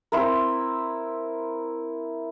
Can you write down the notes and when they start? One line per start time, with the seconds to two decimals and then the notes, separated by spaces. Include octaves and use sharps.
0.12 C4 E4 A#4